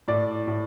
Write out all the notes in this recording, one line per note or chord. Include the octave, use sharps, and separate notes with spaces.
A2 D5
A2